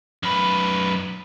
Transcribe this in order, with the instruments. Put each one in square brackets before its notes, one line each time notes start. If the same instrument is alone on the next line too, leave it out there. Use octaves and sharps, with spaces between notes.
[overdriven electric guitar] F#2 B4